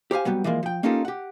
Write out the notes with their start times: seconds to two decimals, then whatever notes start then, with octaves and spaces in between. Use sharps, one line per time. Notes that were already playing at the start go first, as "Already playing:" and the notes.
0.11 G4 C5 F5 G#5
0.25 F#3 G3 B3 G4
0.44 E3 F3 G#3 A#3
0.63 F3 G5
0.83 A#3 C#4 D#4 F4 G4 A4
1.05 G4 F#5